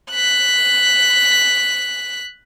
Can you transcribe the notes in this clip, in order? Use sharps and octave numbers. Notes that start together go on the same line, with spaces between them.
F#6 B6